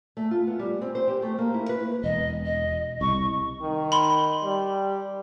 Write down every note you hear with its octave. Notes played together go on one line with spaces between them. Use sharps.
A3
F4
B3
G3
C4
C5
G4
A3
A#3
E4
B4
E1 D#5
D#5
C2 C#6
D#3
B5 C6
G3